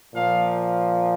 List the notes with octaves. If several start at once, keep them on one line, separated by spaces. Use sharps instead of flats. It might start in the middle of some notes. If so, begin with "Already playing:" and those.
A#2 F3 F5